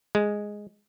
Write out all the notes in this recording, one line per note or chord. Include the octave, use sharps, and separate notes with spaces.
G#3